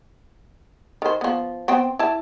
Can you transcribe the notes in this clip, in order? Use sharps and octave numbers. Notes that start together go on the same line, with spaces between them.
D#3 C5
F3 B3
B3 C4 G5
E4 A5